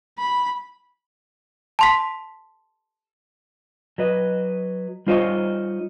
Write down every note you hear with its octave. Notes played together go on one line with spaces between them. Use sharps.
B5
A5 C6 B6
F#3 B4 D#5
G3 D#4 F4 C5 C#5 D#5